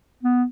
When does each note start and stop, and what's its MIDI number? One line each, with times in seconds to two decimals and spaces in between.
0.23 0.44 59